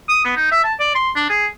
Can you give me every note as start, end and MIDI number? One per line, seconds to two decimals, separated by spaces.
0.09 0.22 87
0.25 0.33 59
0.37 0.50 63
0.52 0.63 76
0.64 0.73 81
0.80 0.94 74
0.95 1.11 84
1.16 1.25 62
1.29 1.46 68